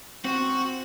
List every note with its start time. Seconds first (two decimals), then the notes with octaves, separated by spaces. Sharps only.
0.25 C4 F#4 C5